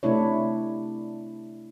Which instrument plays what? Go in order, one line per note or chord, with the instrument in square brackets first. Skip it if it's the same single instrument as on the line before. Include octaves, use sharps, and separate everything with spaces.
[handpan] C3 A3 D4 E4 C#5